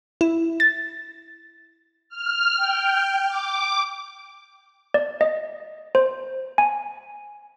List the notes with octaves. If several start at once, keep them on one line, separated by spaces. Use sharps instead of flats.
E4
A6
F6
G5
D6
D5
D#5
C5
G#5